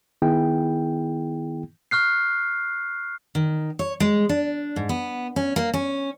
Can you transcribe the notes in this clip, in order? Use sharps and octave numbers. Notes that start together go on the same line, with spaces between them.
D#3 B3 E4 G#4 G5
C#6 F6 F#6 C7
D#3
C#5
G#3
D4
G#2
B3
C#4
A#3
C#4